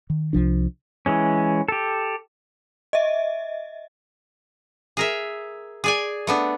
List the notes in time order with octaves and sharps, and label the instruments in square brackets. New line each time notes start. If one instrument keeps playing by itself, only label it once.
[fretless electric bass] D#3
C2 F3 D4
[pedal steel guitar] E3 G#3 C#4
G4 A4
[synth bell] D#5 E5
[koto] G#4 A#4 E5
G#4 D5 G#5
A3 B3 D4